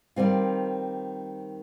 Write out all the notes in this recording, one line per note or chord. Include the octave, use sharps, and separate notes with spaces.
D#3 G3 C4 F4